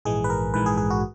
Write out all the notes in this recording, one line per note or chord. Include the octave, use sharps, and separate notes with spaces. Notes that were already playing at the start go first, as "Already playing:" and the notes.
A#1 G#2 E3 G#3 G#4
B4
A#4
A#1 G#2 E3 G#3 B4
G#4
G#4
F#4